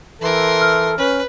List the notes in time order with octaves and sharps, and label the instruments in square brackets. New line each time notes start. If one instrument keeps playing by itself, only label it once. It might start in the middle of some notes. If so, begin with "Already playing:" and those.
[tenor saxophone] E3 [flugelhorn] A4 [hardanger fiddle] A#4 C6
[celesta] F6
[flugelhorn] C#4 [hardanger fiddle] B4